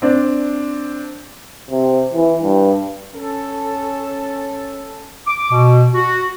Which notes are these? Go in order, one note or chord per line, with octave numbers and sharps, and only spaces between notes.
C4 D4 D5
C3
E3
G2
C#4 A4
D6
B2
F#4